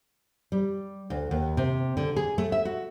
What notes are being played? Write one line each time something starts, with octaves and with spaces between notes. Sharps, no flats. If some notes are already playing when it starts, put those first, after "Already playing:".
G3
D2
D#2
C3
D3
G#4
A3
E5
F#4